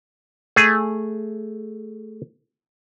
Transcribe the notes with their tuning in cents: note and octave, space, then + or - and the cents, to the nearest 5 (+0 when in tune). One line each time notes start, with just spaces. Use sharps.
A3 +0 G#4 +0